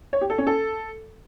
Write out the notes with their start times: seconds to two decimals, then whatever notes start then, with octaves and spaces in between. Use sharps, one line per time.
0.13 C#5
0.21 G4
0.30 A4
0.38 C#4
0.47 A4